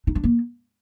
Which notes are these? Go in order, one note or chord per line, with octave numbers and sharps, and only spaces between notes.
D#4
D4
A#3